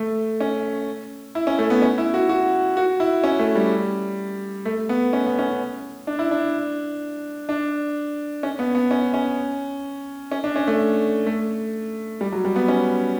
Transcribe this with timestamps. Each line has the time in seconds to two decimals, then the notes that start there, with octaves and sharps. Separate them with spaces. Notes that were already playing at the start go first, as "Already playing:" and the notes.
Already playing: A3
0.40 C#4
1.35 E4
1.47 C#4
1.58 A3
1.70 B3
1.82 C#4
1.98 E4
2.14 F#4
2.29 F#4
2.77 F#4
3.00 E4
3.24 C#4
3.39 A3
3.55 G3
4.65 A3
4.89 B3
5.13 C#4
5.26 B3
5.39 C#4
6.07 D4
6.19 E4
6.31 D4
7.49 D4
8.43 C#4
8.59 B3
8.75 B3
8.91 C#4
9.14 C#4
10.32 C#4
10.44 D4
10.56 C#4
10.67 A3
11.26 A3
12.21 G3
12.32 F#3
12.45 G3
12.56 B3
12.68 C#4